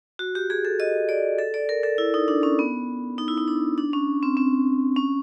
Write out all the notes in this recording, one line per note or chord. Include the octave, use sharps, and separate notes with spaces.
F#4
G4
G#4
A4
D#5
D5
A4
D5
A#4
A4
E4
D#4
D4
C#4
B3
D#4
E4
D#4
D4
D4
C#4
C4
C4
C#4